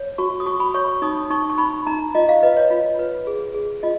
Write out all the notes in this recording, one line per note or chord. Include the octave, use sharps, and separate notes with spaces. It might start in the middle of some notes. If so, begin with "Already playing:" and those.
Already playing: C#5
F#4 C#6
D#6
F#4 C#6
B5
C#5 C#6
C#6
D#4 D#6
D#4 C#6
C#6
D#4 B5
D#4 A#5
F4 D#5
F5
B4 D#5
C#5
F4
B4
G#4
G#4
F4 D#5